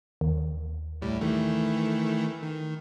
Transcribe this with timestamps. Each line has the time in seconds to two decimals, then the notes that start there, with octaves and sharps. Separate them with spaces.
0.21 D#2
1.02 C2 A2 G3
1.21 D#3 E3 A3
2.42 D#3